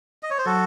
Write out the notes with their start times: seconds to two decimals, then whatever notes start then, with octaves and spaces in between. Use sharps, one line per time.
0.23 D#5
0.31 C#5
0.38 C5
0.45 F#3 F#4 A4